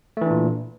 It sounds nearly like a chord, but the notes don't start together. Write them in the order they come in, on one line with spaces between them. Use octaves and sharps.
A3 E3 D4 A#2